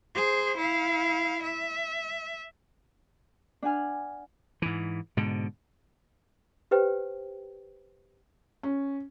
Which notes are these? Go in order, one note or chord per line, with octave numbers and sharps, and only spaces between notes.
G#4 C5
E4 F5
E5
D4 F#5 G#5 F6
G#2 E3
G#2 B2 D3
G4 B4 C5 G5
C#4